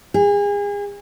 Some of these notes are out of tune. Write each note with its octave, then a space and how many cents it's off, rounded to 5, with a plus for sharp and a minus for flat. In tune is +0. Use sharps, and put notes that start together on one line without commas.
G#4 -35